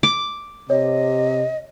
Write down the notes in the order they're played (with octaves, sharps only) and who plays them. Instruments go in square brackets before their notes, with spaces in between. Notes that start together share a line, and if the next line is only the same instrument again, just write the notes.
[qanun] D6
[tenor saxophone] C3 [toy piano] C#5 [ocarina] D#5